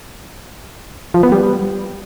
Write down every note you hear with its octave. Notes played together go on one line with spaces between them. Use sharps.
F3
B3
G3